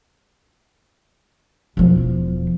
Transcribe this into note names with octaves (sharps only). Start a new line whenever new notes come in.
E1 F3